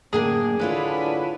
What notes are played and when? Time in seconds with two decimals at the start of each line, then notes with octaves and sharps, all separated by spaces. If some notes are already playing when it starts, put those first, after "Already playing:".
0.13 F#2 A2 D3 A#3 D4 G#4
0.60 D3 D4 E4 F4 B4 C#5